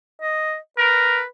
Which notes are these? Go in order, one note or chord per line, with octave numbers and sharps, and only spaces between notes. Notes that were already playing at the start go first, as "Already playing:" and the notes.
D#5
A#4 B4